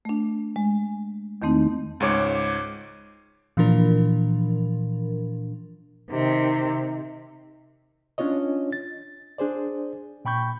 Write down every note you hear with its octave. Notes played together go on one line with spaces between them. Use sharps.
A3 D4
G#3
E2 D#3 A3 C4 D#4
C#2 G#2 C#5 D6
A#2 E3 F3 D4 A#4
C3 D#3
C#4 D4 F4 C#5 D#5
A6
D4 G#4 C5 D5
A#2 G5 B5 C#6 G6